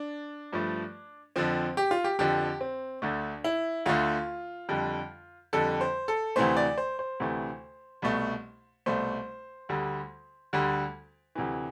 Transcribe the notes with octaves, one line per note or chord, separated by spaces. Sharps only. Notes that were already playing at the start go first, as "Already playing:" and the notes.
Already playing: D4
G2 F3 A3
F2 D3 F3 C4
G4
F4
G4
F2 D3 F3 G4
C4
D2 D3 A3 D4
E4
D2 D3 A3 F4
F2 D3 G3
F2 D3 G3 A4
C5
A4
D2 C3 E3 A3 C5
D5
C5
C5
D2 C3 E3 A3
C2 B2 A3
C2 B2 A3 C5
D2 D3 G3
D2 D3 G3
D2 C3 E3